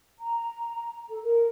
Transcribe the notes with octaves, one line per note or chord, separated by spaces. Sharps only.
A#5
A4
A#4